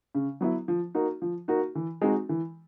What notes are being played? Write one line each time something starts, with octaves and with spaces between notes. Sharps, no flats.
C#3
F#3 B3 E4
F3
A#3 D#4 F#4
F3
A#3 D#4 F#4
E3
G#3 C4 D#4 F#4
E3